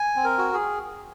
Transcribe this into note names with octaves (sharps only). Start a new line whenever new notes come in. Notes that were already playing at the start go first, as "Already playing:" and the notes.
Already playing: G#5
C4
A#4
F#4
G#4